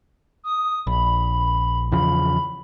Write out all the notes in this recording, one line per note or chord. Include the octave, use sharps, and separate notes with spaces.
D#6
A#1 B5
E2 C#3 F3 B5